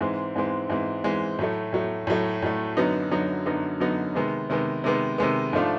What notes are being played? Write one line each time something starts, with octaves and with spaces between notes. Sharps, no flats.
G#2 E3 G#3 C4
G#2 E3 G#3 C4
G#2 E3 G#3 C4
G#2 E3 G#3 C4
A2 F#3 A3
A2 F#3 A3
A2 F#3 A3
A2 F#3 A3
F#2 D3 F#3 B3 D#4
F#2 D3 F#3 B3 D#4
F#2 D3 F#3 B3 D#4
F#2 D3 F#3 B3 D#4
C3 D#3 G#3 B3
C3 D#3 G#3 B3
C3 D#3 G#3 B3
C3 D#3 G#3 B3
G#2 F3 A3 D4 F4